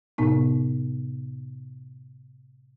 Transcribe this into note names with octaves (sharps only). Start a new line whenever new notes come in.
A2 C3 B3 D#4